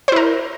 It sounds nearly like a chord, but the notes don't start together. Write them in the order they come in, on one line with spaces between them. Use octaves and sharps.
C5 E4 A#4